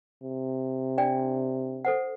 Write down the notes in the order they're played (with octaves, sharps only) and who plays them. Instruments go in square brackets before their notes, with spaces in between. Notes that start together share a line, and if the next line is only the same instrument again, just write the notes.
[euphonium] C3
[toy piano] D4 D5 G5
A4 C5 F#5